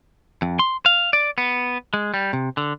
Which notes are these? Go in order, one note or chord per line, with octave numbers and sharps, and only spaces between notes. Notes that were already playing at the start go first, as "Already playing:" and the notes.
F2
C6
F5
D5
B3
G#3
G3
C3
D3